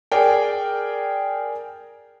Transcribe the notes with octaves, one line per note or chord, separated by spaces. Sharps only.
G#4 A#4 D5 G5